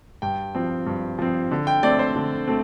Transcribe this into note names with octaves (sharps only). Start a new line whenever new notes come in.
G2 G5
F3 C4
G2
F3 C4
D3
G5
A3 C4 D5
C5
D3
A3 C4